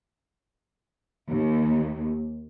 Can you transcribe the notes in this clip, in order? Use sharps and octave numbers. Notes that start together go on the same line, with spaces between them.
D#2